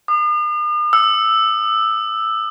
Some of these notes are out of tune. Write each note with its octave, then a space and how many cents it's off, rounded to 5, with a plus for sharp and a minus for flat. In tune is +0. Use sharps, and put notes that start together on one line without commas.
D#6 -45
E6 +0